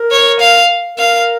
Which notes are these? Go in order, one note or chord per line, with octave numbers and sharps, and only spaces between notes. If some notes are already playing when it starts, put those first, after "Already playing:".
Already playing: A#4
C#5
F5
A#4 F5